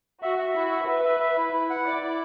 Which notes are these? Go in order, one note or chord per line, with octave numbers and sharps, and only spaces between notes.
F#4 E5
E5
E4 F#4
E5
B4 E5
E5
E5
E4
E4
F#5
E4 D5
E4